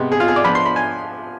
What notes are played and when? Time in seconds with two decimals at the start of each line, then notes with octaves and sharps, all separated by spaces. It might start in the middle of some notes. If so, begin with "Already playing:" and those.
Already playing: C3 G#3 B3
0.12 G#4
0.20 F4
0.28 G#4
0.36 D5
0.44 F3 B3 D4 B5
0.55 C6
0.65 B5
0.76 G#5